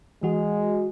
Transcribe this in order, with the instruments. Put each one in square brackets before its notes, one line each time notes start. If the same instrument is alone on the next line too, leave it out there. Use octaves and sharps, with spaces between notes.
[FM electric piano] E3 F#4 [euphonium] G#3